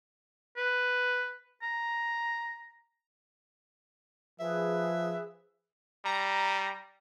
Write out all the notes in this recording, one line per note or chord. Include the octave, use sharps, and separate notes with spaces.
B4
A#5
F3 G#4 B4 E5
G3 A#5